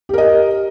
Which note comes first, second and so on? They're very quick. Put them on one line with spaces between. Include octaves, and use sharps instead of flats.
G4 A#4 D#5